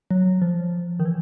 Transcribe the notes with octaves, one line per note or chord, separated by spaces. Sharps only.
F#3
F3
D#3
E3